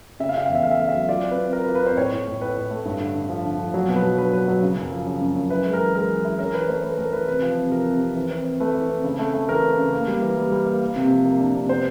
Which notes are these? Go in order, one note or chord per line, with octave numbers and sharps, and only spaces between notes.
C#3 E5
F5
C#3 E5
F5
E2
E5
A3 F5
E5
A3 F5
E5
F#3
F4 D5
C4
B4
C4
F4 A#4
B4
F4
B4
C4 C5
A2 C#5
A2
A2
A2 B4
A2
A3
G2
D3
D3
F3
D3
F3
F#3
B2
B4
F#3
D4 B4
F#3 B4
F#3
C#3
F#2
F3
C#3
F#2
F#2
E4 B4
G#3
A#4
E3
G#3 A#4
E3
E4
C#4 A#4
E3 B4
A3 C5
A3 B4
A3 A#4
E3 B4
C3 B4
F3
C3
F3 A#4
C3
C3
E3
C4
C4
A3 B4
E3
C4
C#3
A3
A3
E3 A#4
C#3
C#3
A#3
G3
E3
G3
G3
A#3
A#3
C3
F3
A#3
D4
C3
B3 C5